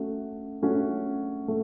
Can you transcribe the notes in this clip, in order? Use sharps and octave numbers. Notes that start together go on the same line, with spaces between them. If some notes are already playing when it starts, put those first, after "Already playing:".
Already playing: A3 C#4 F#4
A3 C#4 F#4
A3